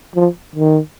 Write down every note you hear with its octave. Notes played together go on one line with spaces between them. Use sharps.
F3
D#3